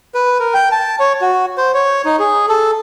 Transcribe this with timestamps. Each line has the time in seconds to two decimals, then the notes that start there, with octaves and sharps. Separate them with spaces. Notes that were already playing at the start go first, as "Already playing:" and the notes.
0.15 B4
0.40 A#4
0.54 G5
0.72 A5
1.00 C#5
1.21 F#4
1.58 C5
1.74 C#5
2.05 D#4
2.19 G#4
2.49 A4